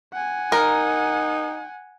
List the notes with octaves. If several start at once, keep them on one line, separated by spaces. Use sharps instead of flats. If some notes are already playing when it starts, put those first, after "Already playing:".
F#5 G#5
D#4 A#4